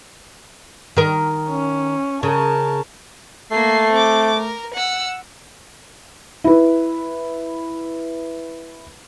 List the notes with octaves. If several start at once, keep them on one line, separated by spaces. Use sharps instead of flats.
D#3 A#4
C#4
C#3 A#4 A5
A3 A#3 C7
C4 D6
A#4
F#5 E6
E4 B4